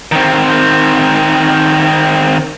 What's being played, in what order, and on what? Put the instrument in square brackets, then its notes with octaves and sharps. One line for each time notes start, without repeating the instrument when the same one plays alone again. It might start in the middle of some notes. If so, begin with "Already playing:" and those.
[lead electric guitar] D#3 C4